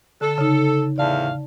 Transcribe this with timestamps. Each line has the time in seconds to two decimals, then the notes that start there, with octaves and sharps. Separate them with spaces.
0.21 D3 A4
0.38 C#3 D#4
0.98 E2 A2 D5 F5 A5